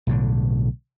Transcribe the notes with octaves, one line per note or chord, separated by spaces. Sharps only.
B1 A2 D3